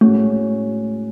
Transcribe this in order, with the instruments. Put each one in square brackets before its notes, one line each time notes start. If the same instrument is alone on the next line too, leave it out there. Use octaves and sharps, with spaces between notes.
[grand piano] A2 G#3 C#4 F#4 [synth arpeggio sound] A3